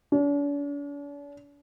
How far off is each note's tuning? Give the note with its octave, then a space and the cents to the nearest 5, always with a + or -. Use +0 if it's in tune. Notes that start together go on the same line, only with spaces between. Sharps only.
D4 -45